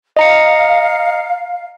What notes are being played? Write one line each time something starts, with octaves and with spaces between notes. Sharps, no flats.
D#5 F5 A#5 C#7